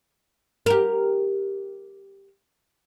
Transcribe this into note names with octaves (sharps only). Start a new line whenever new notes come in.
G4 A#4